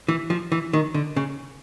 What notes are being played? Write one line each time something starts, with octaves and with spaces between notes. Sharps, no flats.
E3
F3
E3
D#3
D3
C#3